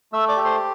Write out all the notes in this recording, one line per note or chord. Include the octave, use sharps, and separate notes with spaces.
A3 E5 E6
D5 D6
G4
C5 C6